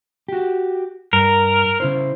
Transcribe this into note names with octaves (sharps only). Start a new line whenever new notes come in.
F#4 G4
G2 A#4
C#3 E4 C5